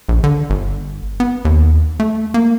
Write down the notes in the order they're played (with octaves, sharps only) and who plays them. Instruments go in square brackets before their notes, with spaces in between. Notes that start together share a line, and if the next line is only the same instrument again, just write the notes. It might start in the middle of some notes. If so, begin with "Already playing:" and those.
[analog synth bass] A#1
D3
G1
B3
D#2
A3
A#3